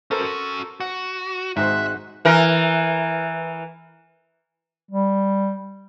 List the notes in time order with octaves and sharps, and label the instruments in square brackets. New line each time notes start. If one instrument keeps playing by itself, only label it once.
[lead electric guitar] C#4 F#4 [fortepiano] A4 A#4 C5
[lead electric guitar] F#4 [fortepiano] F#5
[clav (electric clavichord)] G#1 G#2 G#3 [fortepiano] D#4 F#4 C5 [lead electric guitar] E5 [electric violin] F#6
[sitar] E3 A#4
[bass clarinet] G3